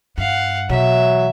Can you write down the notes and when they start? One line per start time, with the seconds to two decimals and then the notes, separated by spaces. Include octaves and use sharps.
0.18 G2 F5 F#5
0.70 B2 E3 F#3 E5